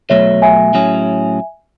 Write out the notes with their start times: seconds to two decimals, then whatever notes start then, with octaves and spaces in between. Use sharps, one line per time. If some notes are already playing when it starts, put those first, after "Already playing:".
0.09 B2 F#3 A3 C#5 E5
0.42 E5 G#5
0.74 A2 F#3 C#4 G#4